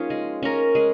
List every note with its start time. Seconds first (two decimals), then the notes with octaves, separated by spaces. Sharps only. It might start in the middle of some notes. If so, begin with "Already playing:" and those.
Already playing: F3 A#3 C#4 D#4 F4 G#4
0.10 G#3
0.43 C#4 A#4
0.75 G#3